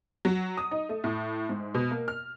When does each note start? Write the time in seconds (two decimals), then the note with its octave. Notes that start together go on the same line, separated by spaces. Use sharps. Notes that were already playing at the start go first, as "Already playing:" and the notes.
0.25 F#3
0.57 D#6
0.71 D#4
0.89 A3
1.04 A2
1.49 G#2
1.75 B2
1.91 A#3
2.08 F6